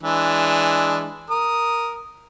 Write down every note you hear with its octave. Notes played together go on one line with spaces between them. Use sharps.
E3 G#3 D4
A#4 D#6